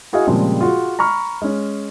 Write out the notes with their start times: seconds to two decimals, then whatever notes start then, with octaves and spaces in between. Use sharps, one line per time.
0.13 E4 F#4 G#4 D#5 F5 G#5
0.27 A#2 C#3 F3 G3 G#3 C4
0.61 F4 F#4 G#4
0.99 A#5 B5 C#6 F6
1.42 G#3 C#4